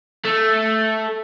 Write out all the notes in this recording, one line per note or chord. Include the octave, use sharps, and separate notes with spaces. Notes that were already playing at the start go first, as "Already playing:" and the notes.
A3